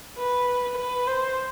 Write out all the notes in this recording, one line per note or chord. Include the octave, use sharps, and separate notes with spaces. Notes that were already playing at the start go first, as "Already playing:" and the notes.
B4
B4
C5